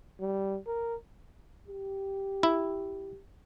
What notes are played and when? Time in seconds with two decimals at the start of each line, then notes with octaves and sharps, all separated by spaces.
0.20 G3
0.67 A#4
1.68 G4
2.43 E4